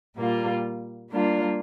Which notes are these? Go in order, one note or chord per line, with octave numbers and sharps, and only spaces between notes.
A#2 G3 A#3 F4
G3 A#3 D4 F4